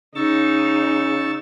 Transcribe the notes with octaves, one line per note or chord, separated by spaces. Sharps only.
C#3 D#4 C#6 E6 A6